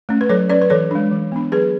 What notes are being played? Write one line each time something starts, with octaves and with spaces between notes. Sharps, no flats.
A3 C#4
B4
F#3 A4 C#5
C#4 B4 D5
B4
E3 A4 C#5
G#3 D4
E3
B3 D4
F#3 G#4 B4